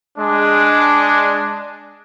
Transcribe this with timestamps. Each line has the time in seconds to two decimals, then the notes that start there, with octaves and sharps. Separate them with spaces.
0.18 G#3 D4